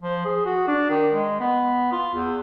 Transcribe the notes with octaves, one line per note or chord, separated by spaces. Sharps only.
F3
G#4
F#4
D4
D#3
G#3
B3
F4
E2